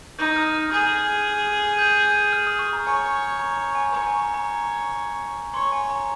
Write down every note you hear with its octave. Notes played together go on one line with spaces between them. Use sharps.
D#4 G6
F6
D#6
F6
G#4 G6
G6
G6
G6
F6
D#6
C#6
A#5
C#5 G#5
A#5
A#5
G#5
C#5 A#5
G#5
A#5
A#5
C#5 C6
G#5
A#5